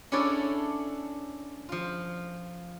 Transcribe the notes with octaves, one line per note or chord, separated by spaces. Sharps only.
C#4 D4 E4 A4 C#5 D5
F3 F4